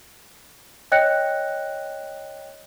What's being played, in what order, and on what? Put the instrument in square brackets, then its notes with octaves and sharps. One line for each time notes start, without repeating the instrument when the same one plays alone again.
[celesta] C#5 D#5 G5 F#6 A#6 C#7